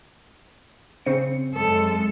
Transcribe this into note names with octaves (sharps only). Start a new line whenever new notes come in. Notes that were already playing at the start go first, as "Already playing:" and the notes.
C#3 C4 C#7
F#2 G#3 A4